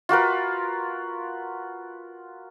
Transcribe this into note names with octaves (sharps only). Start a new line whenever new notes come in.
F4 F#4 A#4 B4